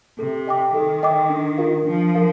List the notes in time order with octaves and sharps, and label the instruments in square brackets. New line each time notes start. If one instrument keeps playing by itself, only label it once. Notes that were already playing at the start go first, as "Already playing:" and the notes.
[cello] C3 [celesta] A4
[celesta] D#5 G5 D6
[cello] D#3 [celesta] A4
[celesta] D#5 G5 D6
D4
F4 A#4 F5
[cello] F3 [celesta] D4
[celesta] A#4 F5